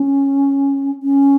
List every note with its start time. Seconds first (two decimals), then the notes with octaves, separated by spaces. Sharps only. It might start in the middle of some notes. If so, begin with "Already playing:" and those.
Already playing: C#4
1.03 C#4